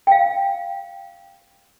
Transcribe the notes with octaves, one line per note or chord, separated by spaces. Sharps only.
F5 G5